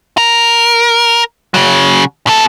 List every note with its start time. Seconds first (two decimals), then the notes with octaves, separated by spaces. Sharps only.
0.18 A#4
1.54 C#3 F#3
2.27 B2 A4